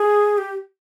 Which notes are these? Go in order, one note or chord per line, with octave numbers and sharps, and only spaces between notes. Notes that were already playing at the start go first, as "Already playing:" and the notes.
Already playing: G#4
G4